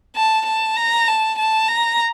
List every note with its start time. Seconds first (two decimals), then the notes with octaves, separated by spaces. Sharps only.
0.16 A5
0.46 A5
0.76 A#5
1.08 A5
1.38 A5
1.68 A#5